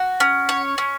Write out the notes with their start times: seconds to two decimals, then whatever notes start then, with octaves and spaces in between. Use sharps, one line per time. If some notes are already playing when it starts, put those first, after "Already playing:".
Already playing: F#4
0.20 C#4
0.49 C#5
0.78 C#4